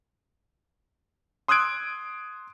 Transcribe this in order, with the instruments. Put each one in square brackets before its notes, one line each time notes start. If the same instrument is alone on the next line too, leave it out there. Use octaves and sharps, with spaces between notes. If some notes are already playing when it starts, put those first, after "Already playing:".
[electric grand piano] C6 D#6 E6 F#6 G#6 D7